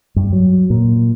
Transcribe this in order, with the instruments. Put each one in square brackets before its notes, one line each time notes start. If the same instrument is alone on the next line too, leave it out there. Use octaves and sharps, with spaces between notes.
[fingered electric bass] G2
F#3
A#2